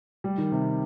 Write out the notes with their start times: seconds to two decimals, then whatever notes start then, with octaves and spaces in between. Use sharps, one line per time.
0.24 G3
0.38 D#3
0.52 C3